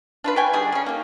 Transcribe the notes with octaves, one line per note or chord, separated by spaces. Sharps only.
D4 F4 B4
B4 C#5 G5 G#5
D3 G3 D4 G#4
C#3 C#4
A#3 D#4